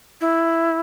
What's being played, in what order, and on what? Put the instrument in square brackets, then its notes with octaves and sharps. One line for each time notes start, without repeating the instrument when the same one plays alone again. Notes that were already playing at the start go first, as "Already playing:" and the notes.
[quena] E4